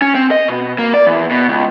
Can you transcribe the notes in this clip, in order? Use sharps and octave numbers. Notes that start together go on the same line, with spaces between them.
C#4
C4
D#5
B2
A#3
D5
E2
B2
C#2